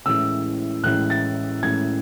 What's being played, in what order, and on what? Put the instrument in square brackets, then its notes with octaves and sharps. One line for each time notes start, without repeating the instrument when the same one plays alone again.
[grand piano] A1 A2 E3 G#3 E6
A1 A2 E3 G#3 F#6
A6
A1 A2 E3 G#3 G#6